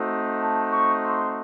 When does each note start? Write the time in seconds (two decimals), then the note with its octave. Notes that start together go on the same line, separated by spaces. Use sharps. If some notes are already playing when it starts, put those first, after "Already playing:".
Already playing: A3 C4 D#4 F#4
0.40 A5
0.72 C#6
1.05 C6